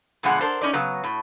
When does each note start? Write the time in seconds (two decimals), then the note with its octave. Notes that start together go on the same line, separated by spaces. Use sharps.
0.23 B2 D3 F3 G#3 D4 F#5
0.41 D4 A4 A#4 C5
0.62 C#4 D#4 D5
0.73 C#3 F#3 B3
1.04 A2